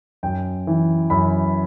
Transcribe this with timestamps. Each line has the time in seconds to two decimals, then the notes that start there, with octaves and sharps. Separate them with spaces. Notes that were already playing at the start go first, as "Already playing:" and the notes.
0.23 F#2 G5
0.67 E3
1.10 F#2 B5